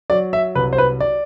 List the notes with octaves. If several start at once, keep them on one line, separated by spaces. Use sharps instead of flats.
F#3 D5
E5
C2 B4
C5
B4
D5